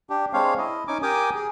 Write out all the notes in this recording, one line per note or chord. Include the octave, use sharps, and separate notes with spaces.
D4 G4
G#3 C4 D4 C#5 F5
E4 D#5
C#4 D#4 G#5 D6
G4 A#4 G5 G#5 D6 D#6
G#4